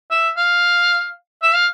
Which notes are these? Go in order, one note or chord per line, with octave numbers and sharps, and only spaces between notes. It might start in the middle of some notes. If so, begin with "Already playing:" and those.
E5
F5
E5
F5